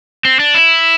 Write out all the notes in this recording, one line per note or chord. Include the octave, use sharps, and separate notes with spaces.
C4
D4
E4